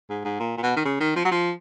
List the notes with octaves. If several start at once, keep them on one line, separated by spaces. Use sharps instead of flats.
G#2
G#2
A#2
A#2
B2
D#3
C#3
D#3
F3
F#3
F3